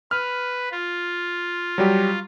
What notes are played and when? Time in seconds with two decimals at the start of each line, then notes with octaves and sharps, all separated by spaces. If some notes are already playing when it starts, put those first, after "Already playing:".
0.11 B4 F6
0.71 F4
1.78 F#3 G3 G4